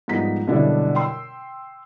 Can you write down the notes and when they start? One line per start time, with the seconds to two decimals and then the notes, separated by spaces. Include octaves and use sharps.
0.08 G#2 F3 G3 B3 D#4 B6
0.47 F#2 B2 D3 G3 D4 E4
0.95 G5 C6 E6